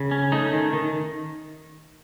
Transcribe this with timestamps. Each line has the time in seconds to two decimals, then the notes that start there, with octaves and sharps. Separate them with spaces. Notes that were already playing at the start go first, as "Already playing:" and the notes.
Already playing: C#3
0.11 C#4
0.32 A3 D#4
0.53 D#3
0.73 D#3